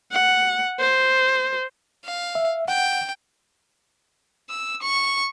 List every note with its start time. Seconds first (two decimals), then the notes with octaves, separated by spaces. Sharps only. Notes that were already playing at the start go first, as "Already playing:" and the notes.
0.12 F#5
0.79 C5
2.04 F5
2.35 E5
2.68 F#5 G5
4.50 E6
4.82 C#6